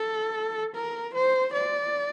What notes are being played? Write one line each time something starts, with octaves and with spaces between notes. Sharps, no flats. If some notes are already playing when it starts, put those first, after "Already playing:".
Already playing: A4
A#4
C5
D5